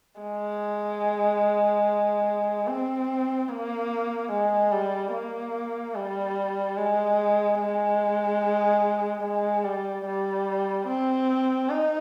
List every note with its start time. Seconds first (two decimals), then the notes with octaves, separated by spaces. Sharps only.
0.20 G#3
2.67 C4
3.49 A#3
4.31 G#3
4.72 G3
5.12 A#3
5.95 G3
6.77 G#3
7.60 G#3
9.23 G#3
9.64 G3
10.06 G3
10.88 C4
11.70 D#4